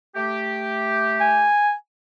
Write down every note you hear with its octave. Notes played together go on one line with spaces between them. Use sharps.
A3 G4
G#5